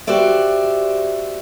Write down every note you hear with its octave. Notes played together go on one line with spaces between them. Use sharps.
F#4 G4 C5 D5 E5